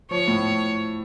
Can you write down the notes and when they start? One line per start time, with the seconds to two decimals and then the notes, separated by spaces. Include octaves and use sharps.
0.11 F3 C#5
0.28 A2